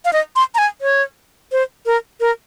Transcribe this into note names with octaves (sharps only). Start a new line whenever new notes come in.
F5
D#5
C6
A#5
G#5
C#5
C5
A#4
A#4